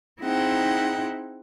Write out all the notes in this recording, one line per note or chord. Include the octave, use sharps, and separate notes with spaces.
C4 D#4 E4 G#4 F#5 G5